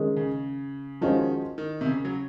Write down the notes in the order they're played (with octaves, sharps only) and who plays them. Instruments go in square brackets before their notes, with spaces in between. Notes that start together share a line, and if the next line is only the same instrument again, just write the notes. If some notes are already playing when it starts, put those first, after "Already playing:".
Already playing: [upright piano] D#3 G#3 C#4 G#4
[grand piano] C#3
[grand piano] D#3 [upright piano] F3 G#3 C#4 F#4 C5
[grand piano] D#3
C3
C#3
F#3